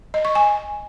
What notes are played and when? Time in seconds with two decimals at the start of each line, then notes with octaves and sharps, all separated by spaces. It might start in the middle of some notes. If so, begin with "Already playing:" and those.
0.14 D#5
0.25 C#6
0.35 G#5